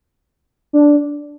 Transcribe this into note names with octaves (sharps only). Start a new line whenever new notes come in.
D4